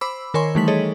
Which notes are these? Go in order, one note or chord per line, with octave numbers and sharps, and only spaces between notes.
C5 B5 D6 E6
D#3 A#4 C#5 G#5 C6 C#6
E3 G3 A3 D#4 B6 F#7
G#4 A4 C#5 D#5